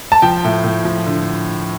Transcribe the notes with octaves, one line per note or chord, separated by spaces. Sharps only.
A5
F3 G5
A2
A2
F3
D3